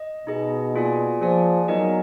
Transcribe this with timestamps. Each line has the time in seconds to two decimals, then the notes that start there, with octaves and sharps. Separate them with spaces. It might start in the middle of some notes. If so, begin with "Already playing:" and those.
Already playing: D#5
0.27 B2 D#4 G#4 D#5
0.74 A#3 F4 G#4 D5 G#5
1.21 F3 A#3 F4 G#4 D5 G#5
1.68 F#3 B3 D#4 A#4 D#5 G#5